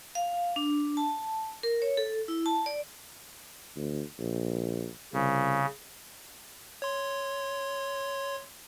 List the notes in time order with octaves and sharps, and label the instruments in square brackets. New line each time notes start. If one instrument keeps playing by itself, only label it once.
[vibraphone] F5
D4
A5
A#4
C#5
A4
E4
A5
D5
[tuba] D2
A#1
[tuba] C2 [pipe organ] C#3
[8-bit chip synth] C#5 C6